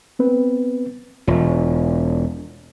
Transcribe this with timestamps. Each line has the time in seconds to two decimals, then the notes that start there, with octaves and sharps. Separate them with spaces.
0.19 B3 C4 B4
1.27 E1 F4